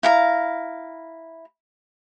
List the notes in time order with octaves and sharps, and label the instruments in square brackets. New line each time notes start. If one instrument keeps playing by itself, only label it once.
[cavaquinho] E4 F5 A#5